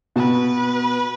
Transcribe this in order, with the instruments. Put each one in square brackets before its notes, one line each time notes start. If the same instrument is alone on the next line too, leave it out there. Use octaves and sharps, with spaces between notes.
[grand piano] B2 [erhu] B4